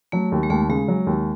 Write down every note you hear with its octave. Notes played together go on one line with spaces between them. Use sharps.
F#3 A3
D#2
G#3
D#2 A3
C#3 G#3
F#3
D#2